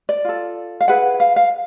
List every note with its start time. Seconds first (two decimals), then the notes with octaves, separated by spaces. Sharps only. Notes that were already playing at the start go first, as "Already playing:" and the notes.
0.09 D5
0.25 F4 A4
0.81 F5
0.88 E4 G#4 B4 F#5
1.20 F5
1.36 F5